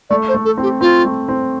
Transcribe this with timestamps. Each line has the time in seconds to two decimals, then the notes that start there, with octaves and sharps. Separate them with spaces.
0.10 A3 D5
0.29 C5
0.34 A3
0.45 A4
0.57 C4
0.63 G4
0.81 C4 F4
1.05 A3
1.28 C4